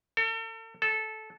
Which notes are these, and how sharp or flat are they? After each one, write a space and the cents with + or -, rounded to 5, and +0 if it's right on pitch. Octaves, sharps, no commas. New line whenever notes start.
A4 +40
A4 -15